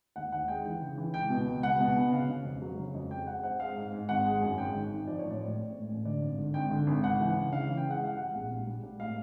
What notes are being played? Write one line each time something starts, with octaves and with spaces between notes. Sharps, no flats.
D#2 F#5
D#2 F#5
G#3 G5
E3 G5
C#3
E3
C#2 G5
B2
C#2
C#2 F#5
B2
B3
C#3 F5
C#3
F2
F#3
C#3
F2
G#3 G5
G#3 F#5
C4 F#5
G#3 F5
G#2
G#2
G#1 F#5
G#3
F#2
G#1 G5
D#3
D#3
F3 D5
A1 C#5
D5
A2
A2
A2
A1
D3 D5
G#1
D3
G#1 G5
D3
G#1
C#2 F#5
E3
C#3
C#3 F5
E3
G5
G#3
F#5
G3 F5
G3 F#5
A#1
A#1
G3
G3
A2 F5